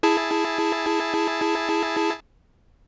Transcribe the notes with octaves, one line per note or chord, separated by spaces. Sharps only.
E4 G#4 A5